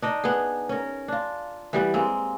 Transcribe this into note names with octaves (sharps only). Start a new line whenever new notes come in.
D4 D#4 D#5
B3 G#4
C#4 A#4
D4 F4
E3 G3 B3
G#3 A#3 C4